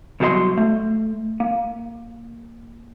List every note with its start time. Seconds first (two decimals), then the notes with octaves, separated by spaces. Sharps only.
0.20 C2 B2 F#3 A4 D#5 C6
0.57 A3
1.40 A#3